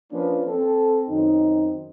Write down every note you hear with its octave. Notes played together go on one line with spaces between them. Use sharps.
F3 A#3 C#4 D4 B4
C4 A4
F#2 D#3 C4 D#4